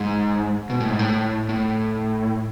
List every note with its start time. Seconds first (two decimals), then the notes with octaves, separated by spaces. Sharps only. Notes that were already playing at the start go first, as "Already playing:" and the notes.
Already playing: G#2
0.70 B2
0.80 A2
0.90 G#2
0.99 A2
1.49 A2